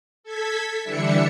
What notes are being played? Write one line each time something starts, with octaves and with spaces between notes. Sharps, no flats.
A4 G#6 B6
D3 E3 G3 D4 E5 C#7